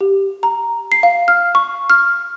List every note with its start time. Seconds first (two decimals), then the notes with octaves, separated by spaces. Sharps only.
0.01 G4
0.43 A#5
0.92 C7
1.03 F5
1.28 F6
1.55 C#6
1.90 F6